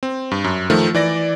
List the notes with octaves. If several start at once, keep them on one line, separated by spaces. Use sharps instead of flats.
C4
G2
F#2
D#3 F3 A3
E3 D5 A#6